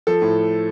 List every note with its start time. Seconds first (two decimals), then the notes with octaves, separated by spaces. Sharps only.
0.07 F3 A4
0.22 A2